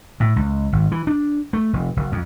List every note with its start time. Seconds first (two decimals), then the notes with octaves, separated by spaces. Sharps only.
0.20 A2
0.36 C#2
0.73 G#1
0.92 E3
1.07 D4
1.53 A3
1.73 F1
1.97 F#1
2.12 F2